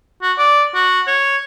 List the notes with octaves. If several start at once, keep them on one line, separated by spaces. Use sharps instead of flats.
F#4
D5
F#4
C#5